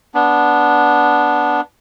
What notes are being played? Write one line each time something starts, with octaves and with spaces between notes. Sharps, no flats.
B3 D4